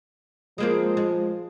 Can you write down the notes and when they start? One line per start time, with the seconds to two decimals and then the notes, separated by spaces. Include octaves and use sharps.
0.58 F3 G#3 A#3 C4
0.97 G#3